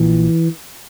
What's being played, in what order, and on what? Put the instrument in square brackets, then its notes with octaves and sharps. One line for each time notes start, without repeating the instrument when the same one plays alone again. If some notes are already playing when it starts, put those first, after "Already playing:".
Already playing: [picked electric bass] A#1 A#2 E3